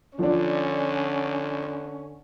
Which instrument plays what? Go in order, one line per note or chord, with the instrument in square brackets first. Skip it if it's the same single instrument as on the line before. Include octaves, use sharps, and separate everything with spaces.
[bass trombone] D3 [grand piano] F3 D4 [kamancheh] C#4